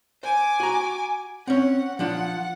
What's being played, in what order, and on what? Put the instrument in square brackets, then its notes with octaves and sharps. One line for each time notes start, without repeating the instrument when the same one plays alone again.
[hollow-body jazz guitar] C5 [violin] G#5 D6
[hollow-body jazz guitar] F#4 A#5
[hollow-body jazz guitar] C4 C#4 [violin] F#5
[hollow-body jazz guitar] F3 D4 F4 [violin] F#5